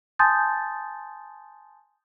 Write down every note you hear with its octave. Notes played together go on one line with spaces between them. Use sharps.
G#5 A5 C6 D#6 G6 A6